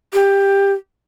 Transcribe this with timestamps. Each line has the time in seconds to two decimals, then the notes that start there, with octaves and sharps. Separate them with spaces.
0.13 G4